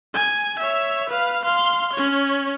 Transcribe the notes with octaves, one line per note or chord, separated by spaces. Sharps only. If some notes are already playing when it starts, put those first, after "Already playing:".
G#5
C#5 E5
B4 F5
F5 C6
C#4 C#5